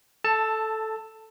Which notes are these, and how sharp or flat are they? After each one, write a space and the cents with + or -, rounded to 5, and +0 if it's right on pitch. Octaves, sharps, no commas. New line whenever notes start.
A4 -5 A5 +15